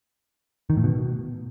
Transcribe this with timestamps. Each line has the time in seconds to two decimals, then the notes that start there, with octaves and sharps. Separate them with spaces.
0.70 D#3
0.77 A2
0.84 B2